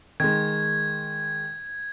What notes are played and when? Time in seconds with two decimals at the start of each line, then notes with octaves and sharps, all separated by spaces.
0.20 D#3 G#3 G#6